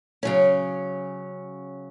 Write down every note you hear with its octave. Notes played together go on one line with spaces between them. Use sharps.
C#3 F#3 C#4